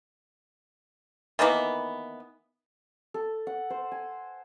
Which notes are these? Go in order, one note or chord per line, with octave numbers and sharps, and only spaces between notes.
D#3 E3 A#3 B3
A4
F#5
C5
G#5